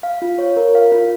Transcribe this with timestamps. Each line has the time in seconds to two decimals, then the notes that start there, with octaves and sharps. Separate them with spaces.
0.03 F5
0.22 F4
0.38 C#5
0.57 A#4
0.75 F5
0.92 F4